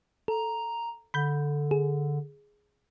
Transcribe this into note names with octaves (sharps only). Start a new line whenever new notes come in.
A4 A#5
D3 B5 G6
G#4